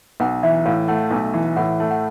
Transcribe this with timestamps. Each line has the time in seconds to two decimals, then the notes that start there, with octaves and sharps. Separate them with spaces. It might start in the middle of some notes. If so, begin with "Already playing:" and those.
0.20 B1 F#5
0.43 E3 E5
0.66 A2 F5
0.88 A3 F#5
1.11 B1
1.34 E3
1.56 A2 F#5
1.80 A3
1.91 F#5